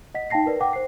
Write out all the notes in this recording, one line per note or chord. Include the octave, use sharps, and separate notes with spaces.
D#5 F#5 B6
D#4 F5 G5 A5 A#6 C7
A#4 B4 D5
F#5 G5 D6
C5 C7